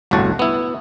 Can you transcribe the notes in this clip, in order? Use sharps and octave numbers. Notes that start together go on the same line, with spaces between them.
G1 C2 A2 F#4 A5
B3 E4